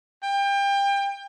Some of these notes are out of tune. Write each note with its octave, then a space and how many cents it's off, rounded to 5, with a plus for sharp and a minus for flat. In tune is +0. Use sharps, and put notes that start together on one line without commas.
G5 +30